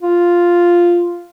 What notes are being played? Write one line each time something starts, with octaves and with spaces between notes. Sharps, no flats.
F4